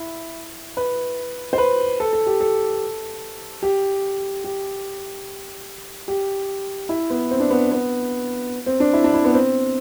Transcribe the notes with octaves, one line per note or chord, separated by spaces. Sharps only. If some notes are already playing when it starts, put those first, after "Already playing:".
Already playing: E4
B4
C5
B4
A4
A4
G4
A4
G4
G4
G4
E4
B3
C4
D4
B3
B3
C4
D4
E4
D4
E4
B3
C4